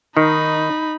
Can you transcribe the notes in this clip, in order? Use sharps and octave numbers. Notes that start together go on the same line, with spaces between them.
D#3 D#4 B5